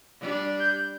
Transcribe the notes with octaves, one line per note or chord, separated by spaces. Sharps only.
G3 D4
G6